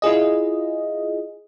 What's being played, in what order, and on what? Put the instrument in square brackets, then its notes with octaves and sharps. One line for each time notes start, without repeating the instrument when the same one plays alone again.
[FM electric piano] E4 F4 G#4 D#5